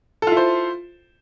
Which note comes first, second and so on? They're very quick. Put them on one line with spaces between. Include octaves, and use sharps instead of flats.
A4 F4 E4 C5